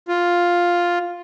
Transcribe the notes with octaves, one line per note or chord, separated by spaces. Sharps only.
F4